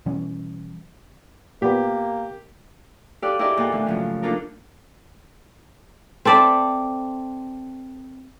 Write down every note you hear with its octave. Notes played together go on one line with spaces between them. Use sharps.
B2 E3 G3 C#4
A#2 A#3 B3 G4
G4 A4 D5 F5 D#6 F#6
E4 G4 G#4 A#4 D5 D#5
E2 A#2 A4 F#5 G5
A2 D3 E3
F#2 C#3 F3
A#3 D4 D#4 F4 A4 A#4
C4 A4 D5 E5